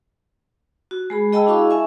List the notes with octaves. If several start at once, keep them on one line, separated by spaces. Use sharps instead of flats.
F#4
G#3 G#4 B5
G#4 D#5 G5 A5 B5 E6
D4 E4 F#4 G#4 F5 C#6
E5 G#5 C#6